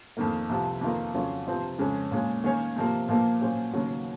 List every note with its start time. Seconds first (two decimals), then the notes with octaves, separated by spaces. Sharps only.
0.17 F2 D#3 A#3
0.49 C2 C3 F3
0.81 F2 D#3 A#3 F4 A#4
1.14 F2 C#3 F#3 C#4 F4
1.47 C3 F3 C4 F4
1.79 F2 C#3 G#3 C#4
2.11 A#2 G#3 C#4
2.44 D#3 A#3 C#4 G#4 C#5
2.76 C3 F3 A#3
3.08 A#2 F3 A#3
3.41 A#2 F#3 C#4 G#4 C5
3.74 D#2 C#3 F#3 A#3